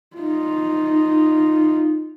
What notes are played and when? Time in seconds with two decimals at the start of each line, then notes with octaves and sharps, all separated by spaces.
0.17 D#4 F4